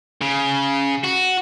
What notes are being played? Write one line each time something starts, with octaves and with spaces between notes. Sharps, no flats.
C#3
F#4